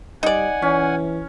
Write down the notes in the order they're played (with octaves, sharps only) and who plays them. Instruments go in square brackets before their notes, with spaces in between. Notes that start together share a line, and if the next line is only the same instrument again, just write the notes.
[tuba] G3 [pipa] D#4 D5 [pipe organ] F#5 G#5
[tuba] E3 [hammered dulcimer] C#4